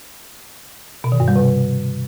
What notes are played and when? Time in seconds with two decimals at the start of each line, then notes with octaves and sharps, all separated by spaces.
1.04 B2
1.12 D#3
1.20 G2
1.28 G3
1.36 C3